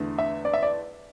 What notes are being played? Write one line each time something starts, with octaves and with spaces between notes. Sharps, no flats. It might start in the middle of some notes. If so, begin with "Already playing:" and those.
Already playing: E2 D3 A3
E5
D5
E5
D5